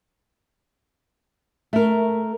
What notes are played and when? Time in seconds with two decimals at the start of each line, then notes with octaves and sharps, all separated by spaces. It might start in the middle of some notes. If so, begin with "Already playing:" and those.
1.73 A3 A#4